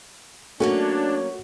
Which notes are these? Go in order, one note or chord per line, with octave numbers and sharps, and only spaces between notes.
F#3 A3 A#3 C#4 D4 F#4